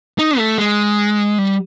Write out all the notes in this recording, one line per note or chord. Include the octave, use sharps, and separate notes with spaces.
D#4
A3
G#3
G3